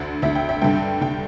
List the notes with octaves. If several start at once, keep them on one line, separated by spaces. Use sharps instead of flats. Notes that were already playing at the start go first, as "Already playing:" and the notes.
Already playing: D2 D3
D2 D3 E5
G5
E5
G2 D3 G5
D3 G5